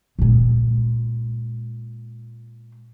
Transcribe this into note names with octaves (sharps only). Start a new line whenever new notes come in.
A#2 G#3